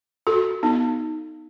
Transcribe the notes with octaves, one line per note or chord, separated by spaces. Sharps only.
F#4 A4
B3 D#4